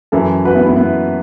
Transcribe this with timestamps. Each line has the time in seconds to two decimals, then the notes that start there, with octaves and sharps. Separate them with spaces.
0.12 F#2 E3 E4 A4
0.45 F#4 B4
0.55 B3 E4
0.66 B3 E4
0.76 B3 E4